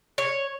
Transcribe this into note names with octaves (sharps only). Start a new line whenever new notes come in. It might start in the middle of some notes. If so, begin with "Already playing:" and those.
C#5